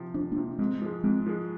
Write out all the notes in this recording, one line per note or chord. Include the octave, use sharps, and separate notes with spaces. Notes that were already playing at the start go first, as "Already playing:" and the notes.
Already playing: C3 F3
F2 D4
A#3 D4
C3 F3
G#2 G#3 C4
F3 G#3
G#2 G#3 C4
F3 G#3